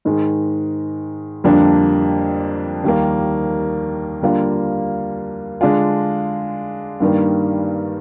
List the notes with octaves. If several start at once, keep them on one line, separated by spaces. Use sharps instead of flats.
G#2 D#3 G#3
F2 D3 G3 A#3 D4
D#2 D#3 G3 A#3
D3 G3 A#3 F4
D3 G#3 D4 F4
G2 D#3 G3 A#3